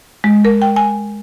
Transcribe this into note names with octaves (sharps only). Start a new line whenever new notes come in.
G#3
A#4
G5
G#5